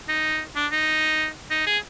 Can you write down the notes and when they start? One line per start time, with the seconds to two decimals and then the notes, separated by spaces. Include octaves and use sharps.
0.08 D#4
0.56 D4
0.72 D#4
1.51 D#4
1.67 G#4